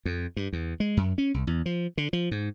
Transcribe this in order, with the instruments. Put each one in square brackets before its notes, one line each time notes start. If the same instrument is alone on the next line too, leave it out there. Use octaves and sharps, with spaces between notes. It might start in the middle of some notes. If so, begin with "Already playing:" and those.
[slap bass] F2
G2
E2
G#3
F#2
C#4
C2
E2
F3
D3
F3
G#2